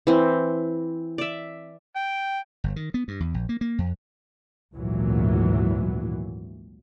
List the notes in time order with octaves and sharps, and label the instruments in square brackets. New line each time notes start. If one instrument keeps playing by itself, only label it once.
[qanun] E3 C4
D5 E5
[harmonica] G5
[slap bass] G1
D#3
B3
G2
E2
A#1
A#3
A#3
F2
[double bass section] G#1 D2 A#2 E3 F#3